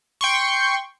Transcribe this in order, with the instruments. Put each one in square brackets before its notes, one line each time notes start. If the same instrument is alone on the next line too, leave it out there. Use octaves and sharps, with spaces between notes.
[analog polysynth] G5 C6 C#6